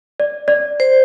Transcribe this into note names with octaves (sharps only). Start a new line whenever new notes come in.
D5
D5
C5